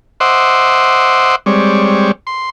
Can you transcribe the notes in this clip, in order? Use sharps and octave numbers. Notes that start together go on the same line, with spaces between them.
C5 D#5 E5 F#5 C6 D6
G3 G#3 C4 C#5 D5
C6